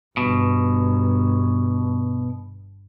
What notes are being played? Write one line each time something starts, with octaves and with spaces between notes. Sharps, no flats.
G1 B2